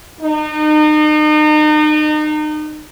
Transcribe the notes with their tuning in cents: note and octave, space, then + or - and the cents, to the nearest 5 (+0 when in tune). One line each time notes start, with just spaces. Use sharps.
D#4 -35